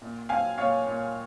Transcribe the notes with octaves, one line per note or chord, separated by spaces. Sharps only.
A#2
C4 F5 G#5
A#2 C#5 F5
A#2